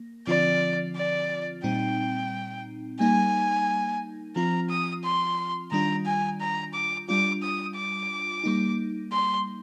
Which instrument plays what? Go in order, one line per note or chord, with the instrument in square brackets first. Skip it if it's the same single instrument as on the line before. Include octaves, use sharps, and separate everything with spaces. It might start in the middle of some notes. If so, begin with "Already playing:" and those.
Already playing: [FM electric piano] A#3
[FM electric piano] D3 F3 C4 F4 [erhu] D5
[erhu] D5
[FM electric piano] A#2 G3 C4 D#4 [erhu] G5
[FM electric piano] G3 A#3 D#4 [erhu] G#5
[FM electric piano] F3 C4 F4 [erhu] A#5
[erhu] D#6
C6
[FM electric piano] D#3 G3 D4 F4 [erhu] A#5
[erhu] G#5
A#5
D6
[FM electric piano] G3 D4 F4 [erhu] D6
[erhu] D#6
D6
[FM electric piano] G3 A#3 D#4
[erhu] C6